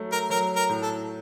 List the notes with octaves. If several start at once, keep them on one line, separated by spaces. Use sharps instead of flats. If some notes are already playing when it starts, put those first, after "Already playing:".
Already playing: F#3 A3
A#4
F#3 A#4
A#4
A2
A4